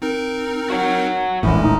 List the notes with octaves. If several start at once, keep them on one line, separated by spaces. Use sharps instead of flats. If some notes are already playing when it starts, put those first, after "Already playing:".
C4 D#4 A#4
F#4 C#5 F#5
D#1 A#1 A2 E3 G#3 C#4
D#4